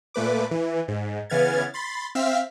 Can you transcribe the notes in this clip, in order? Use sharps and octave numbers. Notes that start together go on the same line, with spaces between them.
A#2 A3 B4 D6
E3
G#2
C#3 E3 B3 F6 G#6 A6
B5 C6 A6
C4 E5 F5 E6 F6 B6